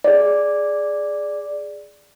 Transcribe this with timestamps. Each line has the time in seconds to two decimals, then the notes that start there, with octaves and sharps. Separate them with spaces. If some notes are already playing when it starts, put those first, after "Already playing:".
0.04 G#4 D5